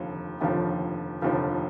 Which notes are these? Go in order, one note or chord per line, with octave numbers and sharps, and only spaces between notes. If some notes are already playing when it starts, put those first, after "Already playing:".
Already playing: F1 D#2 D3 F3
F1 D#2 D3 F3
F1 D#2 D3 F3